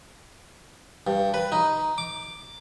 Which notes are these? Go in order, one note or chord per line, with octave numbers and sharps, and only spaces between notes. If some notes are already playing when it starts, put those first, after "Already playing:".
G2
B4
D#4
D6